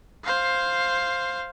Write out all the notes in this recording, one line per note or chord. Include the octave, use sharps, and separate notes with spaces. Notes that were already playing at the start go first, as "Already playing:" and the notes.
C5 F5